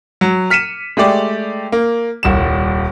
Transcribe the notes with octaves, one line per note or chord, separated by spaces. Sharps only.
F#3
F6 B6 C#7 D#7 E7
G#3 A3 G4 D5
A#3
D#1 C2 E7